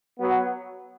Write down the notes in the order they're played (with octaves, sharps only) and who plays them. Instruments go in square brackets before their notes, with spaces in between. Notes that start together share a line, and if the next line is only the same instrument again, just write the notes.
[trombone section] F#3 B3